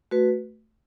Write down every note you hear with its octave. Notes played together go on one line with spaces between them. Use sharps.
A3 F#4 B4